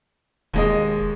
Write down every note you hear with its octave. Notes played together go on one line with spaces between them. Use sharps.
E1 D#2 G#3 D#5